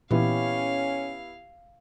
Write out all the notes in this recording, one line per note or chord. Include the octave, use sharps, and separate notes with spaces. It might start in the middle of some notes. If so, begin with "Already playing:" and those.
A#2 E3 B3 C#4 E4 G4 F5